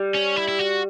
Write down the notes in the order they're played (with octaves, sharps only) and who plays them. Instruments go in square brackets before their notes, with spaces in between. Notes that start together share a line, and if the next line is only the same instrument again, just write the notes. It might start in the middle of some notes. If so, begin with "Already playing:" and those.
Already playing: [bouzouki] G3
[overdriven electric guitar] C#4
E4
E4
F#4